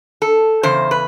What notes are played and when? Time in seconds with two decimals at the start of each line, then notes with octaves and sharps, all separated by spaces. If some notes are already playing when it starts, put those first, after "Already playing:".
0.22 A4
0.63 E2 C#3 C5
0.91 B4